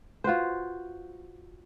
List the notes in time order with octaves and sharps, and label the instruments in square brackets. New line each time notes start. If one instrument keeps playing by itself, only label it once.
[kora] F4 F#4 B4 C5